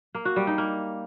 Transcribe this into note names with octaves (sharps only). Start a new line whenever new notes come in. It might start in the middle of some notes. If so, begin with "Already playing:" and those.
A#3
F#4
G3
D#4
A#3